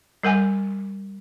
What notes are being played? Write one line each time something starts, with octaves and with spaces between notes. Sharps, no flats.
G3 A#4 F#5 G#5